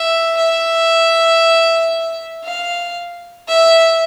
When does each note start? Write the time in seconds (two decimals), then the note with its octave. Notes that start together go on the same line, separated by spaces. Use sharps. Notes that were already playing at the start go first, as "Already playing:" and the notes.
Already playing: E5
0.37 E5
2.44 F5
3.48 E5